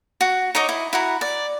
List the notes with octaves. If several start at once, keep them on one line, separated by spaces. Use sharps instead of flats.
F#4
D#4 C#5 D#5 D6
E4
E4 F#4 A#5
D5